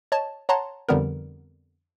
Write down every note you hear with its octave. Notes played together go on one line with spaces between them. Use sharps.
C#5 D#5 A5
C#5 F#5 A5 A#5 C6
F2 D3 G3 B3 A#4